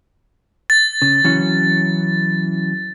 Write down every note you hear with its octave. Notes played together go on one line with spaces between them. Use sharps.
A6
C#3
E3 F#3 C#4